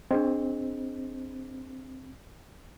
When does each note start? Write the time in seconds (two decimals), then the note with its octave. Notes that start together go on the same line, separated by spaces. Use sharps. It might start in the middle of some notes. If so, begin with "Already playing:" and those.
0.11 C4 D4 G#4 D#5